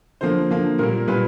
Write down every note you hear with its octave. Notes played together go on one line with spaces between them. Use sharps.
D3 F3 A#3 C5
D3 F3 A#3
A#2 G3 A#3 A#4
A#2 G3 A#3 B4